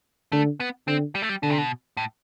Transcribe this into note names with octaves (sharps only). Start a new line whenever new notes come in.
D3 A3
B3
D3 C4
G3
A3
G3
B2 D3
C3
B2
A2